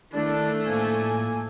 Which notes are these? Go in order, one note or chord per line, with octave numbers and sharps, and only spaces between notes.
D#3 A3 D4 E4 A4
A2 F3 A#3 G#5